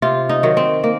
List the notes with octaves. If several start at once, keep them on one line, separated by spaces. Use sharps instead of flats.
C3 F4
D#4
D#3 F#3
C4
A#3